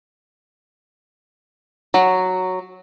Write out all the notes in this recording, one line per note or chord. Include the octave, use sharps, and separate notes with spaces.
F#3